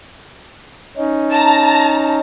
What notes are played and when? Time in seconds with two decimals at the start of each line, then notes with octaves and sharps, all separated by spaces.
0.97 C#4 D#4
1.31 A5 A#5